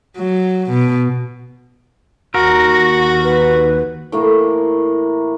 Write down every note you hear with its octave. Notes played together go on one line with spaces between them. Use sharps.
F#3
B2
D#2 F#4 A#4
B4
A2 E3 A#3 E4